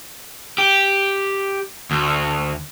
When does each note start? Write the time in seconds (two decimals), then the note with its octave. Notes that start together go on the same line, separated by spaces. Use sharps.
0.58 G4
1.91 D2